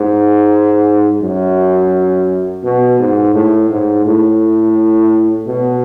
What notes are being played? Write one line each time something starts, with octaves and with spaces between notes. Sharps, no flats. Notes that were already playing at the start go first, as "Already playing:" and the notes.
Already playing: G#2
F#2
B2
G#2
A2
G#2
A2
B2